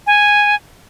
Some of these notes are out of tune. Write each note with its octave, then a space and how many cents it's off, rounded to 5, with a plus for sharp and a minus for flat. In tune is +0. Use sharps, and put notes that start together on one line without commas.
G#5 -5